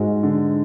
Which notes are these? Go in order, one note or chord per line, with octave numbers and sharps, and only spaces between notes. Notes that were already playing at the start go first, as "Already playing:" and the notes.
Already playing: G#2 G#3 F#4
D3